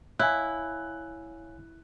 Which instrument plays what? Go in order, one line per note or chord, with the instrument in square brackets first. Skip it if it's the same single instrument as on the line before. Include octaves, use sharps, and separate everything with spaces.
[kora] E4 [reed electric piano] C#5 F5 G#5 [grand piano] F#6